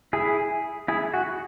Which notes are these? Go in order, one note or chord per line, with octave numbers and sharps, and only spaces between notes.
E4 G#4
E4 G#4
F#4